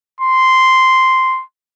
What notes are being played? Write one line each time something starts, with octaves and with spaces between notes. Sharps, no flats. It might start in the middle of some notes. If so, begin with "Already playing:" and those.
C6